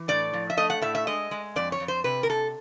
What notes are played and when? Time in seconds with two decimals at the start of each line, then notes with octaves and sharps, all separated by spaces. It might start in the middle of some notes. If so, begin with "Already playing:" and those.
Already playing: E3
0.08 A2 D5
0.34 F3
0.50 E5
0.57 A3 D#5
0.70 F#5
0.82 A2 E5
0.95 E5
1.07 G#3 D#5
1.31 G#3
1.56 F2 D5
1.72 C#5
1.80 F2
1.88 C5
2.04 C3 B4
2.23 A#4
2.29 C3 A4